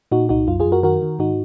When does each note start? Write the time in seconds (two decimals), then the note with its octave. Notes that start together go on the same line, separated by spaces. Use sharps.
0.12 A#2 D#4 F#4
0.29 C2 D#4 F#4
0.48 F#2 F4
0.60 F4 G#4
0.65 F#2
0.72 F#4 A#4
0.83 D#3 F#4 A#4
1.02 D#3
1.19 G#2 D#4 F#4